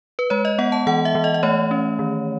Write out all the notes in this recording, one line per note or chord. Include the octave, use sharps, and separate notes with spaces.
B4
G#3 C#5
D#5
B3 F#5
A5
E3 F#5
E5
E3
D#5
D#5
A3 C#5
C#4
D#3